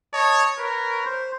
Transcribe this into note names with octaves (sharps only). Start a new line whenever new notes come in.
C#5 D#5 A5
A#4 B4 C#5
C5